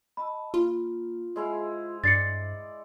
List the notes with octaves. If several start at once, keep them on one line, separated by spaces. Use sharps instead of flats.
D#5 A5 B5 E6
A#3 F4
G#3 E4 C5 F5
G2 D5 A6 C7 C#7